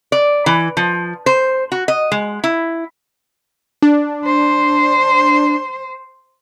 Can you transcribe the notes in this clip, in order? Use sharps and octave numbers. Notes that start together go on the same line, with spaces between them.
D5
E3
F3
C5
F#4
D#5
G#3
E4
D4
C5